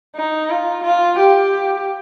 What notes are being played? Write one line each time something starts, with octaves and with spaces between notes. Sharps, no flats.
D#4
F4
F4
G4